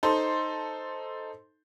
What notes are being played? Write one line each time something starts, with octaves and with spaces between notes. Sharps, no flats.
D#4 A4 C5 C6